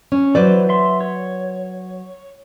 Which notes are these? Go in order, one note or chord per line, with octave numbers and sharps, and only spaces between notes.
C#4
E3 F#3 B4 C5 D5
E5 C6
C#5